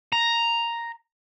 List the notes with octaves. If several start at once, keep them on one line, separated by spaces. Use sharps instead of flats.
A#5